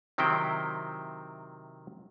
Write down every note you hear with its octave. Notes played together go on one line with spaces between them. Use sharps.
C3 D#3 F#3 C4 E4 G5